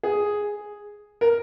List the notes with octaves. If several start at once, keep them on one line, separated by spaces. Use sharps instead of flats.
G#4
A#4